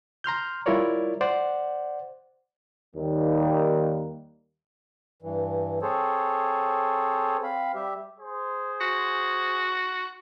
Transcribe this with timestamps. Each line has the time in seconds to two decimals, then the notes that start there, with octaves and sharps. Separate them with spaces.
0.24 A#5 C6 F6 G6
0.66 G3 E4 F4 A#4 C#5 D5
1.21 C5 D5 F#5
2.96 D#2 D#3 G3 A#3
5.22 G2 E3
5.82 C4 G#4 A4 C5 C#5
7.43 C4 F5 B5
7.75 G3 G4 E5
8.19 G#4 C5
8.81 F#4